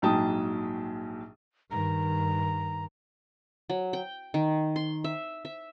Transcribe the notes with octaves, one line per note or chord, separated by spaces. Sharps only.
A#1 G#2 F#3 G5 A5 D#6
G2 D#3 A#5
F#3
G5
D#3
C6
E5
E5